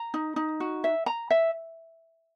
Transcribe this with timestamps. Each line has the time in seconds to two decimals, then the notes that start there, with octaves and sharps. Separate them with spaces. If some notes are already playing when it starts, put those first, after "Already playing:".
Already playing: A#5
0.14 D#4
0.36 D#4
0.60 F#4
0.84 E5
1.06 A#5
1.30 E5